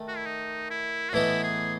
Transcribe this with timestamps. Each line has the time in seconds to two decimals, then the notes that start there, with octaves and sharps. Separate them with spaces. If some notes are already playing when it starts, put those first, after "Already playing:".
Already playing: D#3 A3
0.08 F#4
0.17 E4
0.26 D#4
0.70 E4
1.09 F#4
1.13 A2 E3 B3 D#4 E4
1.43 G#4